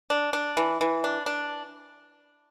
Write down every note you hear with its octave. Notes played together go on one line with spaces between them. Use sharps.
D4
D4
E3
E3
D4
D4